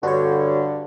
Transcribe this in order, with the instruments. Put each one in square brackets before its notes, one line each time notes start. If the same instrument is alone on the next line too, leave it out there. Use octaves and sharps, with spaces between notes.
[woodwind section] G2 D3 [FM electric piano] F#4 C#5